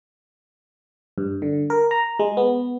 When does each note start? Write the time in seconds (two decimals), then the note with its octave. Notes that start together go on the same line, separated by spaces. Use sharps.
1.18 G2
1.42 D3
1.70 A#4
1.91 A#5
2.19 G#3
2.37 B3